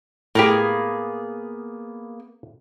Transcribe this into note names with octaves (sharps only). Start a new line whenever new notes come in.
A2 A#3 B3 G4 G#4